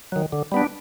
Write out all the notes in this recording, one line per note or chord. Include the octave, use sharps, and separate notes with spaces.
D#3 F#3
D3
G3 B3 D4